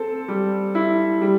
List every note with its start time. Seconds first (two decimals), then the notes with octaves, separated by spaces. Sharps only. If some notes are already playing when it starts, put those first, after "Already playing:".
Already playing: C4 A4
0.28 G3
0.75 E4
1.21 G3